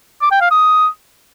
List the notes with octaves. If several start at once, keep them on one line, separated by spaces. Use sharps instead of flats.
D6
G5
F5
D#6